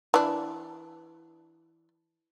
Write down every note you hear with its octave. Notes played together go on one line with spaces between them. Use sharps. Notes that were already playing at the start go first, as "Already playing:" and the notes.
E3 D4